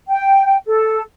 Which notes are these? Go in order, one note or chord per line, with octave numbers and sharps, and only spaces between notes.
G5
A4